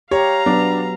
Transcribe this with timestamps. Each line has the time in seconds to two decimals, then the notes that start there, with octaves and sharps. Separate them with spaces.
0.11 G4 C#5 F5 A#5
0.46 F#3 B3 D4